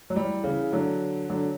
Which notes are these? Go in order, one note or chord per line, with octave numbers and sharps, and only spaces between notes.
F#3
E3 G3
C#3 E3
D3 F#3
D3 F#3